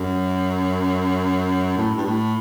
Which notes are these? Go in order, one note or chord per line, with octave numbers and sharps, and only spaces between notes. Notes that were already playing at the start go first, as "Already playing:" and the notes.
Already playing: F#2
A2
G2
A2